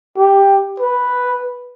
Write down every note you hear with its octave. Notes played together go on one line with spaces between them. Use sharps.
G4
B4